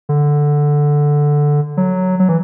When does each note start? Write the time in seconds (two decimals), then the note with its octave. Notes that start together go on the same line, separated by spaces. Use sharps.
0.09 D3
1.77 F#3
2.19 F#3
2.29 E3